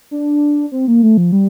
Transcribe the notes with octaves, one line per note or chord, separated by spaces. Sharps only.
D4
C4
A#3
A3
F3
G3